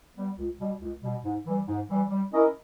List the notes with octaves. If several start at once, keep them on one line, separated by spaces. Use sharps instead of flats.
G3 B3
C#2
B2 G3
C#2
B2 G3
G#2
E3 G3
G#2
E3 G3
G3
C#4 E4 A#4 D#5